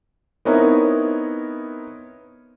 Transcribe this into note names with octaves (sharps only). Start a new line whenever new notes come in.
B3 C4 D#4 E4 A#4 C#5